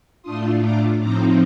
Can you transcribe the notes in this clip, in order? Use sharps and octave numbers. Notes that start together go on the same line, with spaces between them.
A2 A3 D4 F4 C6 D#6
A#5 D6
A2 F3 C4 D#4 A#5 D6